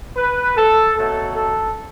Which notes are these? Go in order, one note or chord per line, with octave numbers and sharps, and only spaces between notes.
B4
A4
B2 F#3 A3 A4
A4